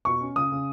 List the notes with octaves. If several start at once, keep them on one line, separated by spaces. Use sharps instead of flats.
B2 C#6
C#4
C#3 D#6
C#3